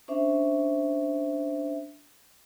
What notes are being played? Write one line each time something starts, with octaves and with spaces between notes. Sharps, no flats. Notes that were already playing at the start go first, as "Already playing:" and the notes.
C#4 D4 C5 E5